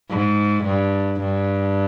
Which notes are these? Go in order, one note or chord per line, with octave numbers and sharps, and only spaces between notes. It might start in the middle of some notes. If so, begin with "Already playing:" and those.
G#2
G2
G2